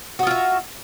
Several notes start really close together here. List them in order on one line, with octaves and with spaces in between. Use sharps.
F#4 D#5 F4 E5